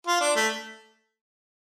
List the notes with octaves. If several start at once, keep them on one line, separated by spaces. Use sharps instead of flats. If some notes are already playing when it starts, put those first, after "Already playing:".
F4
D4
A3